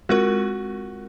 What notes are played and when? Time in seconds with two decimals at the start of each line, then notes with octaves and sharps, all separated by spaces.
0.09 G#3 C4 F4 F#4 A#4